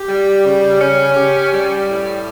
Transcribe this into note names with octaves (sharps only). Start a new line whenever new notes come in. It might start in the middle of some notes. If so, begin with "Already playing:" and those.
Already playing: G4
G3
C#3
C#4
G4
G3
A2